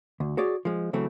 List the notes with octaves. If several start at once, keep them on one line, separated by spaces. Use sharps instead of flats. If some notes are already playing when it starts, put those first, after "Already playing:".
D2
F#4 G#4 C#5 D5
F3 G#3
C#3 E3 F#3 A3 C4